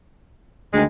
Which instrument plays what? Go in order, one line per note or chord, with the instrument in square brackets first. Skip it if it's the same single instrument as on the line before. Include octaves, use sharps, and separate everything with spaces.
[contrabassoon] D2 [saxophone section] D#3 G#3